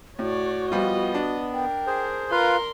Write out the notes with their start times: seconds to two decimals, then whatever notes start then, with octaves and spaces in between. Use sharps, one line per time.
0.19 A2 F#4 C#5 D5
0.72 F3 G3 B3 F4 D#5
1.14 D4
1.53 A#4 G5
1.87 G#4 C5
2.31 F4 A#4 B4 F5 A#5 C6